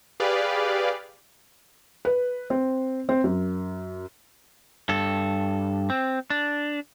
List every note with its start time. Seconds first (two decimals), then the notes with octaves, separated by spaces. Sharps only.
0.20 G4 G#4 B4 D5 F5
2.05 B4
2.50 C4
3.09 C4
3.24 F#2
4.89 G2 A4
5.90 C4
6.30 D4